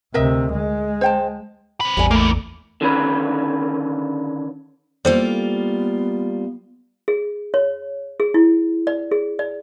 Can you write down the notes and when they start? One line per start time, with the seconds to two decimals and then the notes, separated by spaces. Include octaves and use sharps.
0.14 D2 C3 A#4 D#5 E5
0.53 G#3
1.01 C5 G5 A5
1.81 C4 B4
1.97 A1 E2 G3 G#5
2.11 E3 A3 A#3
2.81 D3 D#3 C#4 B4
5.05 G3 A#3 B3 F4 A4 C5 D5
7.08 G#4
7.54 C#5
8.20 G#4
8.34 E4
8.87 D5
9.11 G#4
9.39 D5